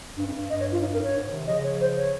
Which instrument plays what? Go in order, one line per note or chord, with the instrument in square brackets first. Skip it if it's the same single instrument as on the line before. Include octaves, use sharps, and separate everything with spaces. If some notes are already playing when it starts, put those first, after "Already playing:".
[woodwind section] G2
F2
G2
[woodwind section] G2 [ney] D#5
[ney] C#5
F4
D#4
[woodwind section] F2 [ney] A#4
[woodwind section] G2 [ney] C#5
[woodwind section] G#2
C3 D#3
[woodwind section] C#3 F3 [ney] D#5
[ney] C#5
C5
C#5